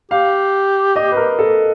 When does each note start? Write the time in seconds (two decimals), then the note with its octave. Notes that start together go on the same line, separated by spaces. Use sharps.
0.11 G4 F5
0.96 D#5
1.12 B4
1.17 A#4
1.39 A4